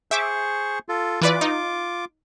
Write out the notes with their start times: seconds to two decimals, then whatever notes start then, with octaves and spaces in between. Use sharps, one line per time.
0.11 G#4 C5 E5 C#6 D6
0.89 F4 A4
1.22 E3 F4 B4 D5 D6
1.41 D#4